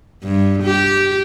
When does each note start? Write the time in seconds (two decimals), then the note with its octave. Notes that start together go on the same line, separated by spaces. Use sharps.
0.24 G2
0.63 G4